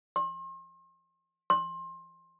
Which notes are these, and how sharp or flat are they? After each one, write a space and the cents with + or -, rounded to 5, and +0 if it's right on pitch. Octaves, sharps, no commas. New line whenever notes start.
C6 +40
C6 +25